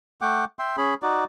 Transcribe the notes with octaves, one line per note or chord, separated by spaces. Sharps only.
A3 F#5 G5 D6
E5 G5 C6
C#4 G#4 B5
D#4 F#4 D5